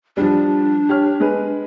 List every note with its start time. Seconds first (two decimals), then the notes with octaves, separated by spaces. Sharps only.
0.17 F3 G3 D4
0.89 G4 C#5 F6
1.20 G#3 G#4 B4